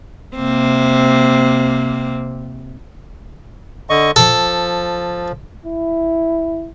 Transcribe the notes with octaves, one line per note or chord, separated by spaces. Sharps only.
C3 A#3 C4
D3 D#5 C#6
F3 A4
E4